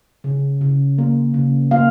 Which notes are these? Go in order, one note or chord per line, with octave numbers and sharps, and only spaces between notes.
C#3
C#3
A#3
C#3
A#3 F5